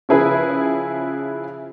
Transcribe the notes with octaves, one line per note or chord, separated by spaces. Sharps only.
C#3 F3 E4 G#4 B4